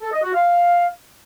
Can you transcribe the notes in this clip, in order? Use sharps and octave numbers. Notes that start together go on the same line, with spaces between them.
A4
D#5
F#4
F5